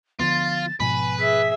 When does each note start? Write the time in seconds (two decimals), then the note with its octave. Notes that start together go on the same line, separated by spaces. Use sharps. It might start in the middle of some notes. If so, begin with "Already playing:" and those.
0.20 D3 F3 B3 F4 A6
0.80 G#2 B2 F3 B4 G#5
1.19 G#4 E5 B6